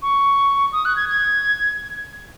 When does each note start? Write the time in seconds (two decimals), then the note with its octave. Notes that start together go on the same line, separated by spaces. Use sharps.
0.02 C#6
0.72 D#6
0.85 F#6
0.96 G#6
1.09 G#6